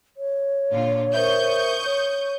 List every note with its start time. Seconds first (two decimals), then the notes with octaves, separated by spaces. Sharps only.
0.17 C#5
0.71 A#2 D3 F4
1.14 A#4 C5 E5 C#6 D#6 G6
1.86 C#5